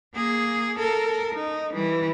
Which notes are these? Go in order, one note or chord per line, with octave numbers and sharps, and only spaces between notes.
A#3 G#4
A4 A#4
D#4
E3 G3